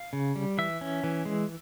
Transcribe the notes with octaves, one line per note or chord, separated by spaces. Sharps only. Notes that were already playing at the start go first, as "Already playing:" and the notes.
Already playing: F5
C#3
G3
E3 E5
C#4
E3
G#3